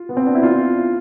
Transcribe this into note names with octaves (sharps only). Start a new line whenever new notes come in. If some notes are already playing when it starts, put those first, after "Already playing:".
Already playing: F4
B3
C4
D4
E4
F4